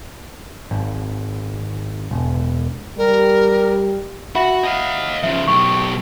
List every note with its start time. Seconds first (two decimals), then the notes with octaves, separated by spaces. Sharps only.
0.71 G#1
2.11 E1
2.98 G3 A#4
4.35 F#4 E5 F#5 B5
4.63 D#5 F5
5.23 C#3 F3 E5
5.48 B1 G4 C#6